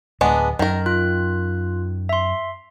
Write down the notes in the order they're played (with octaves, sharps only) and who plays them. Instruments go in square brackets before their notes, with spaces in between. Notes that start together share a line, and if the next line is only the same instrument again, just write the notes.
[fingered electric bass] D1 [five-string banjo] G#3 B3 D4
[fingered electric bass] F#2 [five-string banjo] D#3 A#4
[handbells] F4 F#6
E5 C6